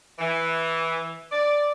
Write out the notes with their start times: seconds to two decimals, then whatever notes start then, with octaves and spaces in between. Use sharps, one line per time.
0.19 E3
1.31 D5